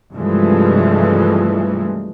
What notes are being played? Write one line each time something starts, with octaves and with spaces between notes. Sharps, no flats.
G2 C3 E3 F3 G#3 A3